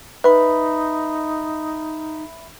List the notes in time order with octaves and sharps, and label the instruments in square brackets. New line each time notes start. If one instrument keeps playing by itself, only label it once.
[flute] D#4 [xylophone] B4 [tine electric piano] E5 B5